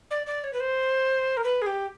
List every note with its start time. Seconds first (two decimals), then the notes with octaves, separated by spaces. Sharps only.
0.11 D5
0.27 D5
0.44 C#5
0.53 B4
0.60 C5
1.37 A#4
1.44 B4
1.62 G#4
1.66 G4